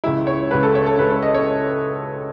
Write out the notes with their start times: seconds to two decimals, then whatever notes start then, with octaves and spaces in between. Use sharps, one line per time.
0.04 C#2 C#3 G#3 E4
0.27 C#5
0.51 C#2 C#3 G#3 B4
0.63 A4
0.75 C#5
0.86 A4
0.98 C#2 C#3 G#3 B4
1.11 C#5
1.22 D#5
1.35 C#5